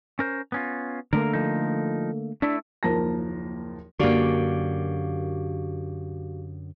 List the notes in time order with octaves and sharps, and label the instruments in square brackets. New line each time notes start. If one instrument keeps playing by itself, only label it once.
[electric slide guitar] C#4 A#4 C5
B3 C#4 F4
[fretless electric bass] D3 A3 A#3 [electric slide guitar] A#4
[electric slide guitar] F3 D#4
[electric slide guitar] A3 E4 [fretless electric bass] D4
[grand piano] F#1 D#2 F3 A#4 A5 A#6
[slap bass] F#2 D3 [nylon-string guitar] A#3 D4 [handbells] F#4 G4 F5